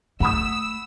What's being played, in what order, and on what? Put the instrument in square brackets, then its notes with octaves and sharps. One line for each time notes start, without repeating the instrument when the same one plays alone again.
[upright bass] A3 [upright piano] F#5 B5 D#6 [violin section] E6